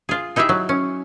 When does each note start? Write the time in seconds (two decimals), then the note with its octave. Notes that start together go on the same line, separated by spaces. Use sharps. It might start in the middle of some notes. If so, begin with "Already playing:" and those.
0.09 F4 G#4
0.36 D#4 E4 G4 G#4 E5
0.49 F#3
0.69 C#4